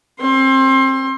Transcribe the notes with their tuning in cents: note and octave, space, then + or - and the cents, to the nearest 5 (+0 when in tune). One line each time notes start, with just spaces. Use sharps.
C4 +30 C6 +25